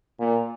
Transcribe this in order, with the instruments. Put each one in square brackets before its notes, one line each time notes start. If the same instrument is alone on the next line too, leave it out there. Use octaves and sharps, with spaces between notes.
[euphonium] A#2